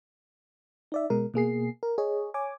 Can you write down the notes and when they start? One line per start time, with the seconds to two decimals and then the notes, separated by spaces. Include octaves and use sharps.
0.92 D#4 D5 E5
1.10 B2 G#3 A#4
1.34 B2 A#3 G#4 C7
1.83 A#4
1.98 G#4 C#5 D#5
2.34 C#5 G#5 D6